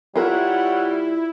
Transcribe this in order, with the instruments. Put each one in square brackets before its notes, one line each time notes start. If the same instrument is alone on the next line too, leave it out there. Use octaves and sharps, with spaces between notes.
[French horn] G3 [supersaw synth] E4 [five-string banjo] F4 A#4 [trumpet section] C#5 F#5